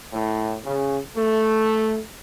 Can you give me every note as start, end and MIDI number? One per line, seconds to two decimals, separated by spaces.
0.12 0.56 45
0.65 0.97 49
1.15 1.99 57